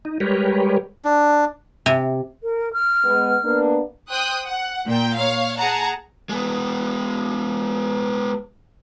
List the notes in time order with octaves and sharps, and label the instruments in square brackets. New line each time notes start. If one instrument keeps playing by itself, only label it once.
[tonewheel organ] D#4
G3 G#3 G4 A#4 B4 C#5
[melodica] D4
[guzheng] C3
[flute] A#4
F6
[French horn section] G#3 B3
A#3 B3 D4
[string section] C5 G5 D#6 F#6
F#5
A#2 G5
C#5 F5
G#4 F#5 A5 A#5
[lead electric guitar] G#3 B3